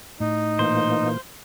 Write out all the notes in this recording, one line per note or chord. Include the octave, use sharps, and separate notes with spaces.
A2 D#4
A#2 E3 A#3 C5